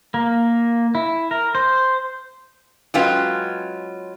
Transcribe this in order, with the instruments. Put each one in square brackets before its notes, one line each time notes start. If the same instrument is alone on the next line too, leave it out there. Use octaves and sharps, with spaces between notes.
[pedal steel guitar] A#3
E4
A#4
C5
[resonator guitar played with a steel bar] F#3 G#3 C#4 F4 B4 G5